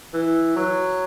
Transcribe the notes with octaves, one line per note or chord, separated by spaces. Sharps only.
E3
F#3